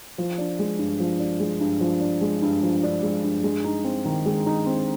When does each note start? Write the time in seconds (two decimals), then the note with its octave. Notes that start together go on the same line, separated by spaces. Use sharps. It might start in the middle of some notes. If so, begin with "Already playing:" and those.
0.18 F3
0.38 D4
0.59 G#3
0.79 G2
1.00 F3
1.19 D4
1.40 G#3
1.60 G2
1.80 F3
2.01 D4
2.21 G#3
2.42 G2
2.63 F3
2.83 D4
3.03 G#3
3.24 G2
3.43 G#3
3.64 D#4
3.84 C4
4.05 D#3
4.26 G#3
4.46 D#4
4.66 C4